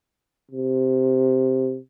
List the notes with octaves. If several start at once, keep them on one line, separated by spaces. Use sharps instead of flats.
C3